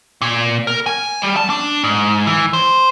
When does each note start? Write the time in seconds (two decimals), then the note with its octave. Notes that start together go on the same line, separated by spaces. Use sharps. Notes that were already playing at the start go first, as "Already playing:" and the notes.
0.22 A#2
0.67 A#4
0.86 G#5
1.22 G3
1.37 A5
1.50 D4
1.84 G#2
2.27 E3
2.53 C5